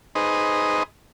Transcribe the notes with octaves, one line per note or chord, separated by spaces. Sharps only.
D#4 G#4 B4 C5 D#5